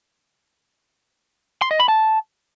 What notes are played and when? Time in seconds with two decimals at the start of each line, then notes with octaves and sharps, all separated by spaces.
1.62 C6
1.71 D#5
1.80 B5
1.88 A5